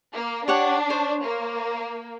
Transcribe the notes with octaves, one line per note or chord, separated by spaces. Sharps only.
A#3
D4 G4 C#5 F#5
C5 C#5
A#3